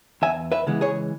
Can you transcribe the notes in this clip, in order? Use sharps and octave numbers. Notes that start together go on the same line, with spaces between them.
E2 E5 G#5
B4 E5
C#3 E3 G#3 B3
G#4 C#5